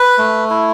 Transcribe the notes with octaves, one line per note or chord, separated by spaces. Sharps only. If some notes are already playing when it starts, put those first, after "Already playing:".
Already playing: B4
A3
E4